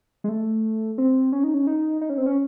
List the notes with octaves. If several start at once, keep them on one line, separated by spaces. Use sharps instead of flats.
G#3
A3
C4
C#4
D#4
C#4
D#4
D#4
C#4
C4
C#4